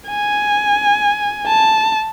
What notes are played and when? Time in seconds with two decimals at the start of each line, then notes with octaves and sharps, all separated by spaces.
0.10 G#5
1.47 A5